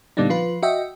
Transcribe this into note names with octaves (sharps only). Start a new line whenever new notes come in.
A#2 D3 G3 B3 D4 D#4
F3 F4 B4
F#4 D#5 E5 G5